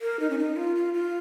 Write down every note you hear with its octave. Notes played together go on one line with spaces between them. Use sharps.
A#4
D#4
C#4
D#4
F4
F4
F4